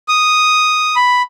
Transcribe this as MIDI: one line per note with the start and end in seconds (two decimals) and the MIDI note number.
0.08 0.95 87
0.96 1.22 83